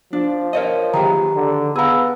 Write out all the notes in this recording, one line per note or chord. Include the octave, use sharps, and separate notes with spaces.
F3 D4
A#4 C#5 D#5
D#3 G4 G#4 B4 A#5
D3
B3 G#4 F5 A#5 B5 E6